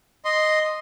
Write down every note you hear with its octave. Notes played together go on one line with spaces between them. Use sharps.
D#5 C6